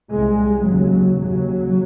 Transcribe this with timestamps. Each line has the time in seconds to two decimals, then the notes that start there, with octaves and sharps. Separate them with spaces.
0.13 C2 C3 G#3
0.66 D#2 C#3 F#3
1.20 D#2 C#3 F#3